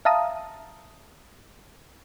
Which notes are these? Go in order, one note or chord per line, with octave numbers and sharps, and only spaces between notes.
E5 F5 A5 A#5 D#6